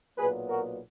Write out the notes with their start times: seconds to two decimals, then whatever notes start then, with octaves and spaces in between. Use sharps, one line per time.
0.17 B1 A#2 F#3 B3 G#4 B4
0.48 F#4 A#4